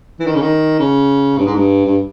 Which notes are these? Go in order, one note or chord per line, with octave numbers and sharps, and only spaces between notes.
E3
D#3
C#3
D#3
C#3
G2
G#2
G2
G2